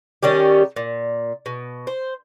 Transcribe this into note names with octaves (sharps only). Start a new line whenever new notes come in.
D#3 G3 C#4 G4
A#2
B2
C5